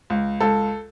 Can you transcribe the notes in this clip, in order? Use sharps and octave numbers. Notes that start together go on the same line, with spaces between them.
C#2
C#2 A4